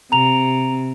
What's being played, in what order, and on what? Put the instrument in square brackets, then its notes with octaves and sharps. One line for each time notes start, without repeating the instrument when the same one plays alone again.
[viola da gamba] C3 [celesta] A#5 F7